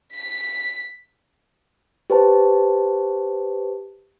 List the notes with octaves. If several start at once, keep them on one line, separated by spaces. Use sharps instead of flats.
B6
G4 B4 C5 A5